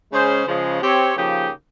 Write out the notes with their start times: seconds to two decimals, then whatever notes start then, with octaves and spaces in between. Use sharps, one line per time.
0.12 C#3 G#3 C#4 G#4 C5
0.47 C#3 F3 G#3
0.82 C4 G4 C#5
1.16 C#3 F3 A#3 D#4 G4